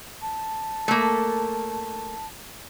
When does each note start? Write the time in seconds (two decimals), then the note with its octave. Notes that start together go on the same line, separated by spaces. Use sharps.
0.21 A5
0.88 A3 A#3